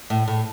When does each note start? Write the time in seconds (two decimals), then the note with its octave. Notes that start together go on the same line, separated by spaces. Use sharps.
0.10 A2
0.28 A2